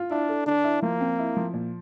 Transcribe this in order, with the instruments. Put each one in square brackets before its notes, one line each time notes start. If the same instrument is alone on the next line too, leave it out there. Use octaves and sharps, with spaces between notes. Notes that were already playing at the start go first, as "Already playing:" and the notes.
Already playing: [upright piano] F4
[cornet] D4 [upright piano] E4
[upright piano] A4
[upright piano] D3 [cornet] D4
[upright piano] E4
[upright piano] F3 [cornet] A#3
[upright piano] C4
E4
F3
A#2